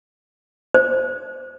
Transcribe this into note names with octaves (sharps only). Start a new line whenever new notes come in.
C5